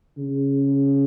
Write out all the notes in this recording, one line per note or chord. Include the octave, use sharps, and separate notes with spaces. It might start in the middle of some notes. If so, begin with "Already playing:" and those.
C#3